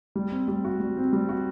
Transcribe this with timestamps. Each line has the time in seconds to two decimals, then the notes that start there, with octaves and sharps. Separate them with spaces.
0.15 G3
0.32 C4
0.48 G3
0.65 F#4
0.80 G3
0.97 C4
1.13 G3
1.29 F#4